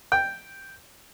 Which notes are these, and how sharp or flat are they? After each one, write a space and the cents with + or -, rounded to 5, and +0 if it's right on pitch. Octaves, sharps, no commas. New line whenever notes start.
G5 +0